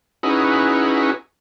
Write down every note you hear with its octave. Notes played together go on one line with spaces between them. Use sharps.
C#4 D#4 E4 F#4 G#4 B4